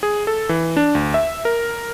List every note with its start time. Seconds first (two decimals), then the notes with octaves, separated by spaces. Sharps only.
0.03 G#4
0.27 A4
0.49 E3
0.77 D4
0.95 D2
1.14 E5
1.45 A#4